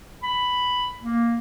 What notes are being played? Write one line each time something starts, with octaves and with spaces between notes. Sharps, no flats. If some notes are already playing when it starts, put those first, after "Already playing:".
B5
A#3